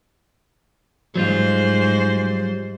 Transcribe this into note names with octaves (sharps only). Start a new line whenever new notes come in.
G#2 F#3 G3 F4 C5